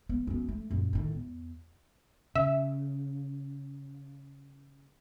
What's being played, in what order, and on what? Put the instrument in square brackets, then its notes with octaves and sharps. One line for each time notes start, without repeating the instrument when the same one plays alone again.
[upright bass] B3
F#2 B3
A3
F#2 A#2
A2 D#3
E2
[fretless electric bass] C#3 [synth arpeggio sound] E5